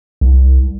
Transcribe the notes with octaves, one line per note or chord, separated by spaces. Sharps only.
C2